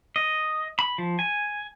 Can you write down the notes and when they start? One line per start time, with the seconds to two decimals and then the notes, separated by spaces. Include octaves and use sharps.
0.16 D#5
0.79 B5
0.98 F3
1.19 G#5